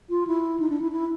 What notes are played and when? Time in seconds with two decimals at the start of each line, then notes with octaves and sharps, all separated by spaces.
0.10 F4
0.27 E4
0.60 D#4
0.70 D4
0.82 E4
0.92 E4